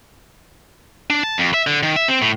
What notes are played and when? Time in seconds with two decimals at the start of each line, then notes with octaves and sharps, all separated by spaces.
1.10 D4
1.24 A5
1.38 F2
1.54 E5
1.67 D3
1.83 D#3
1.96 E5
2.08 C4
2.22 A2